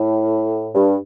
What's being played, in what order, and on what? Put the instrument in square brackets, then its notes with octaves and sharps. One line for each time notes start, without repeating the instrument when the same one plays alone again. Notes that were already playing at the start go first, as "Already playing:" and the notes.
Already playing: [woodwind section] A2
G2